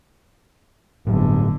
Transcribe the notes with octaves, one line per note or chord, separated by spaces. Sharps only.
G1 A2 D3 F#3